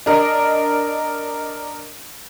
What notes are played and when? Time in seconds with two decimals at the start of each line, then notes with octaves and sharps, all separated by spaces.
0.06 D4 A#4 D#5